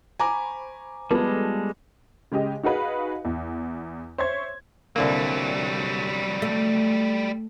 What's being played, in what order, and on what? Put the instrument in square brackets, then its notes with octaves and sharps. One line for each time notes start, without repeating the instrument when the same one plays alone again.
[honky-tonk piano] C5 B5 C#6 [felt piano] G#5 A#5 D6
[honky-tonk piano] F3 A4 A5 [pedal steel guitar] G3 G#3 [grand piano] B3
[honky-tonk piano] C#3 G#3 G4 D#5
D#4 F#4 G#4 B4 F5
E2
C5 C#5 E5 C6 C#6 G#6
[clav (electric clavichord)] C2 D3 A#3 [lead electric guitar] F#3 G3
[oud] A3